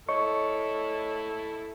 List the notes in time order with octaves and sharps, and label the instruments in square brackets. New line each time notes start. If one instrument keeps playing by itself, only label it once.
[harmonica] E4 A4 [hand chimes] C#5 D#5 [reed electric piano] C#6